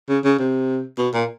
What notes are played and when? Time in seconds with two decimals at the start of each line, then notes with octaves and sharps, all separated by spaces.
0.09 C#3
0.24 C#3
0.39 C3
0.98 B2
1.14 A#2